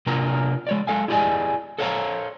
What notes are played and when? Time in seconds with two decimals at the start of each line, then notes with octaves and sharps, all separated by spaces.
0.06 C3 A#3 D4 F4 A#4 A#5
0.67 G#3 C#5 D5
0.87 G#3 A4 F5 G#5
1.08 E4 G4 G#4 D5 D#5 G#5
1.79 A4 C5 C#5 F5 G#5 A#5